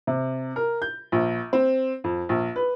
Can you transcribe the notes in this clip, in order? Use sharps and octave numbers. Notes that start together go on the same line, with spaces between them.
C3
A#4
G6
A#1
C4
F2
A#1
B4